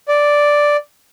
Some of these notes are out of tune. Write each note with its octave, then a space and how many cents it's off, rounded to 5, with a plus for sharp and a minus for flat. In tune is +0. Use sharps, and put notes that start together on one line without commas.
D5 +0